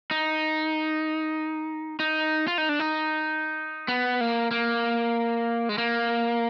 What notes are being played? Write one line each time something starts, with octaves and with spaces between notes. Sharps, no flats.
D#4
D#4
F4
D#4
D4
D#4
B3
A#3
A#3
G#3
A#3